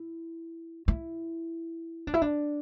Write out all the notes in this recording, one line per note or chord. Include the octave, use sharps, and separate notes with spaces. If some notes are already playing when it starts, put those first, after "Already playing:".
Already playing: E4
E4
D4
E4
D4